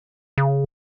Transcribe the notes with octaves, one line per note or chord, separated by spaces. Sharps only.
C#3